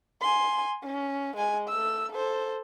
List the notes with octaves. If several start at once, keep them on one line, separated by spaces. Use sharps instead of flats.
G#5 C6
C#4
G#3 G#5
A3 E6
A4 C5